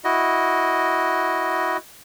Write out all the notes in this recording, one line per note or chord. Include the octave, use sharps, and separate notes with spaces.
E4 F#4 D#5